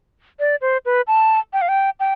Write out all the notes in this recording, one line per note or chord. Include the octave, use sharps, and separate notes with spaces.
D5
C5
B4
A5
G5
F5
G5
G5